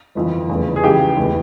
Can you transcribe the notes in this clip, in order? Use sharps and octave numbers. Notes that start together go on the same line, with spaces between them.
G1 F2 E3
F1 E2 C#3
G#4
C#2 C#3 E3 G4
F1 E2 E3